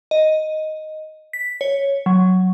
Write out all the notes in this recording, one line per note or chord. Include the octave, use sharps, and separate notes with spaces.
D#5
B6
C#5
F#3